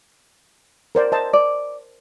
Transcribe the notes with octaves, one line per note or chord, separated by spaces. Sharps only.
A#4 C5 D5
C5 D#5 A5
D5